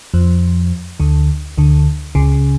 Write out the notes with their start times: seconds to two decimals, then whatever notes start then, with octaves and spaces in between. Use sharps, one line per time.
0.14 F2 F3
1.00 D2 D3
1.58 D2 D3
2.15 C#2 C#3